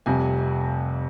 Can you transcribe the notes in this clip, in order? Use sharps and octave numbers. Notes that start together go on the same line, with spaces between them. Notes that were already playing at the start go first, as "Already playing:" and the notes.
F1 F2 C3 G3 G#5